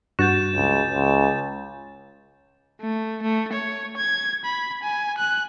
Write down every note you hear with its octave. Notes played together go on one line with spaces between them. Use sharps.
G2 F#4 G6 A6 E7
C#2
C#2
A3
A3
C#5
G#6
B5
G#5
F#6